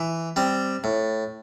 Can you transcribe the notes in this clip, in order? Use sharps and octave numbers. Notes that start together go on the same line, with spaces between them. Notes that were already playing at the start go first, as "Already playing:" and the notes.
Already playing: E3
G3 C4
A2